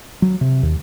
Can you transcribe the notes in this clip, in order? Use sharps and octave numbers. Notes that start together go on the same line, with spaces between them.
F#3
C3
D#2